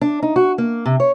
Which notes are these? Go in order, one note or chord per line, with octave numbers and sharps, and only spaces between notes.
D4
D#4
F#4
A#3
C3
C#5